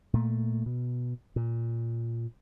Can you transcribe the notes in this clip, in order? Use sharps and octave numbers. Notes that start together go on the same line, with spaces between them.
A#2 A3
B2
A#2